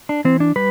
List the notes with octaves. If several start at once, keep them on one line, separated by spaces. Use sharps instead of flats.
D4
E3 C4
D4
G3 B4